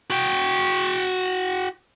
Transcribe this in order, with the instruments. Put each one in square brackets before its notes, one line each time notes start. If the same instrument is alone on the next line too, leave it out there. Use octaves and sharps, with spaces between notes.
[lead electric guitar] F#4 G5